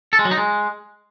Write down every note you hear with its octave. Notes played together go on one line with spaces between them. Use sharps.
A4
G#3
F#3
D#4
G#3